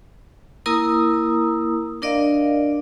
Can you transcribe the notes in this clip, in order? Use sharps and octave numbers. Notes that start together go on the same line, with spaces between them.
A#3 E4 A#4 A#5 D#6 E6
D4 A#4 D5 D#5 F5